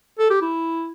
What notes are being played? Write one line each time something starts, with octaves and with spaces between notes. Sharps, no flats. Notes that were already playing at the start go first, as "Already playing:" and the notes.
A4
G4
E4